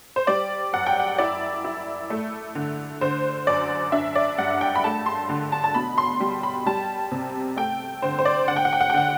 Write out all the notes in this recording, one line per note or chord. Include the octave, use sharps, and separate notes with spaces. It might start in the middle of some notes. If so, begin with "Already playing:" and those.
C5
G3 D5
F#2 F#5
G5
F#5
E4 D5
E4
A3
D3
D3 C5
F#2 D5
D4 E5
D5
G2 F#5
G5
B5
A3 A5
C6
D3
A5
A5
B2 B5
C6
G3
B5
G3 A5
C3
A3 G5
D3 C5
C5
D5
D3 F#5
G5
F#5
G5
F#5
G5
D3 F#5